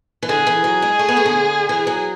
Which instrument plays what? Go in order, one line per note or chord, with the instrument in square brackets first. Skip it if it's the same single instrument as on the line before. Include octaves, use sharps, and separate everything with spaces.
[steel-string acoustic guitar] E3
[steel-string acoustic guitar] D3 [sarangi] G#4
[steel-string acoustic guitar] E3
F#3
G#3
A3
B3
A3
D3
[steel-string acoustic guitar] E3 [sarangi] G#4
[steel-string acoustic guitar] F#3